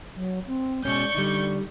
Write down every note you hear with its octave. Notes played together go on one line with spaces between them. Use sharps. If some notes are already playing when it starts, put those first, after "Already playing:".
F#3
C4
B2 G#3 C#4 D5 C#6 G6
D3 G3 D#4